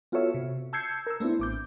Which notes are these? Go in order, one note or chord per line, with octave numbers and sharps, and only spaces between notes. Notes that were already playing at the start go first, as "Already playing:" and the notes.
B3 F4 F#4 A4 C#5 E5
C3
A5 E6 G6 G#6 C7 C#7
A#4 E6
A3 B3 C4 D4 E4
A1 D6 G6